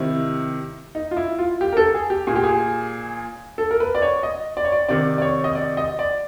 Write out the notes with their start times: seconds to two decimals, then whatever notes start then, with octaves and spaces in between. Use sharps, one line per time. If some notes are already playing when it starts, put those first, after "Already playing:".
Already playing: C3 D#3 E4
0.95 D#4
1.11 F4
1.17 E4
1.39 F4
1.61 G4
1.73 A#4
1.77 A4
1.94 G#4
2.10 G4
2.27 A#2 G#4
2.36 G4
2.44 G#4
3.58 A4
3.71 A#4
3.80 B4
3.95 D5
4.02 C#5
4.23 D#5
4.57 D5
4.65 C#5
4.72 D5
4.89 C3 D#3 D5
5.18 D5
5.22 C#5
5.44 D#5
5.55 D5
5.77 D#5
5.99 D5